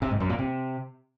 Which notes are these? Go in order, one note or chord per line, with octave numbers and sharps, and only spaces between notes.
C3
G#2
F#2
A#2
C3